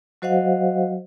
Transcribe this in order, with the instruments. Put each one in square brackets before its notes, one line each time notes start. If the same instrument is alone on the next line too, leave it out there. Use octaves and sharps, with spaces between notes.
[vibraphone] F#3 F#4 C5 D#5 F5 F#5